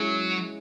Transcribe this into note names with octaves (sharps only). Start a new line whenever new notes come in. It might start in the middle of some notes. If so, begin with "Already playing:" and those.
Already playing: F#3 G#3 C#4 E4